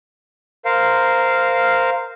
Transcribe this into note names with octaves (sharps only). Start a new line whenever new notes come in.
A#4 C5 F5